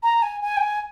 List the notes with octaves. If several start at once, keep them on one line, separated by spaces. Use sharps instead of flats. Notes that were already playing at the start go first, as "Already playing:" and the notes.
A#5
G#5
G#5
G5
G#5